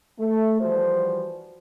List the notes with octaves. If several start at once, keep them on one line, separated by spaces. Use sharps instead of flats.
A3
E3 F3 G3 F#4 C5